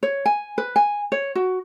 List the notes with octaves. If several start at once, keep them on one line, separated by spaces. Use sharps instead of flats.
C#5
G#5
B4
G#5
C#5
F#4